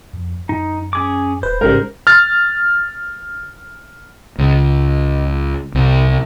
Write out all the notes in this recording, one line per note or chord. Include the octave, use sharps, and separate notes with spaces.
F2
F#2 D#4
C#4 G#4 D6
D#1 B4 C5
A1 G#2 C#3 G3 A#4
F6 A6
C#2
C2